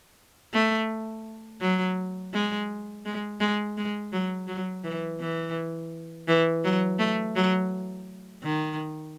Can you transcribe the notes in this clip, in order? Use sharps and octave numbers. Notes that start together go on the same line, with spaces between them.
A3
F#3
G#3
G#3
G#3
G#3
F#3
F#3
E3
E3
E3
F#3
A3
F#3
D#3